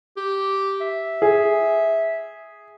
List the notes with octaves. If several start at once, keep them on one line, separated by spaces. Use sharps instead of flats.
G4
E5
G#4